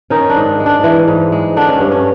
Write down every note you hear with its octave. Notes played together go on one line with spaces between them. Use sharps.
D#3 C#4 D#4
D4
G#2
G#3
D4
E3
G#2
G#3
D3 D4
C#4
G2
C#4